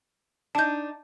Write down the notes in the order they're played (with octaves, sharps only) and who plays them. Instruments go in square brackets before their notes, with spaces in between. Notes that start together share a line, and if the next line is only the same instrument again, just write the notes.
[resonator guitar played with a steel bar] D4 D#4 [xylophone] A5 G6